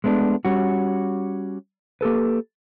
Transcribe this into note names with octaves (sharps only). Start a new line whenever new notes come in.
G#3 A3 B3 D4
G3 C#4 F#4
A#3 G4 A4 B4